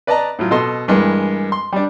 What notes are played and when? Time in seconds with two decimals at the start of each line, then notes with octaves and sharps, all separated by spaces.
0.07 B4 D5 D#5 A5 A#5
0.39 A2 F#3 F4
0.51 B2 A4 D#5 C6
0.88 G2 E3 G#3 A#3
1.52 C6
1.73 G3 D4